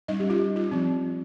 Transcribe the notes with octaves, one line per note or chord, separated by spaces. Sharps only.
G3 D#4 D#5
C#4
G3 G4
F4
F4
F3 C4